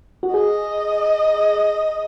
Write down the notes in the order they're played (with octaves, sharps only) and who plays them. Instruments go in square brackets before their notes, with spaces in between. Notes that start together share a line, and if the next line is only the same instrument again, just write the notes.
[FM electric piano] F#4
[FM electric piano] G#4 [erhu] D#5